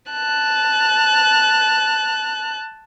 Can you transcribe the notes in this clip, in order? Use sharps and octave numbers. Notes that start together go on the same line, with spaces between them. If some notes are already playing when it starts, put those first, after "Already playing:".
A5 F#6